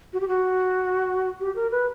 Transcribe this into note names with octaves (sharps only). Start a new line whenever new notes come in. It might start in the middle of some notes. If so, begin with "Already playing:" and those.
F#4
G4
F#4
G4
A#4
B4